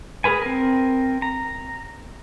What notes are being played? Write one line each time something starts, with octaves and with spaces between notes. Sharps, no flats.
G#4 A#4 B4 G#5
C4 A#4
A#5